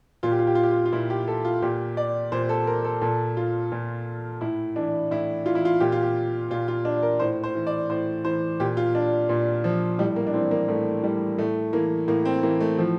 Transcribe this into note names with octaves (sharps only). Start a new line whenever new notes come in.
A#2 F4
G4
F4
G4
F4
G4
F4
F4
A#2 E4
G4
A4
F4
A#2 G4
D5
A#2 C5
A4
A#4
A4
A#2 A4
F4
A#2
A2 E4
E3 D4
A2 E4
E3 F4
E4
F4
A#2 G4
F4
G4
A#2 F4
F4
D4
A#4
A2 C5
C5
E3
D5
A2 C5
E3 C5
A#2 G4
F4
D4
A#2
F3
A2 G3
A#3
D4
E3 C4
A#3
A2 A3
E3 G3
A2 A3
E3 A#3
A2 A#3
C4
E3 A#3
A3
A2 F3